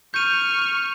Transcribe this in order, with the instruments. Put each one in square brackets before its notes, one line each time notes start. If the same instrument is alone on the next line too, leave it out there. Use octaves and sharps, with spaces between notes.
[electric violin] C#6 F6 [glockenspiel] G6 D#7